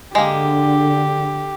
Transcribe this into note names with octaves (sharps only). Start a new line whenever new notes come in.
D3 G#3 A#3 G4